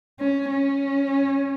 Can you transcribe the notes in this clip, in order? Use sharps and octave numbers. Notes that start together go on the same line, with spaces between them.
C#4
C#4